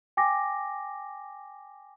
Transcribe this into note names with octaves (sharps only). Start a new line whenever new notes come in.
G5 G#5 D6 A#6